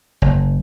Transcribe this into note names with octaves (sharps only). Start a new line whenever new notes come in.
F#1